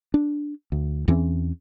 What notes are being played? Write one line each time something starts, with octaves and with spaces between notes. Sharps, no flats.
D4
D2
E2 E3 C4 C#4